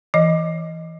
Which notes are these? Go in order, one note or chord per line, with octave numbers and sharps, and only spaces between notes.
E3 D#5